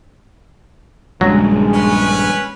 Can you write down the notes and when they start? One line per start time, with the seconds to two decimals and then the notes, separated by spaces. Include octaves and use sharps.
1.21 A#1 G2 C#3 F#3 G#3
1.73 C#4 B4